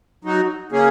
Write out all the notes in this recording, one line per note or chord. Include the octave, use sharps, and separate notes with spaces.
F#3 D#4 F#4
C#3 A#3 C#4 G#4